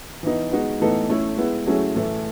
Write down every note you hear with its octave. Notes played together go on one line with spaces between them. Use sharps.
E3 B3 D#4
G#3 B3 D#4 F#4 B4
A2 E3 B3 D#4 A4
A3 C#4 E4 A4
G#3 B3 E4
F#3 A3 C#4 E4 G#4
A2 E3 A3